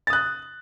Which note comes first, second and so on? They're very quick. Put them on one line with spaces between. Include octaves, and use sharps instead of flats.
A6 D#6 F#6